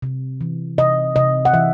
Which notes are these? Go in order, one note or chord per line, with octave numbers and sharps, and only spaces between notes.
C3
E3
C3 D#5
C3 D#5
F#5
E3 E5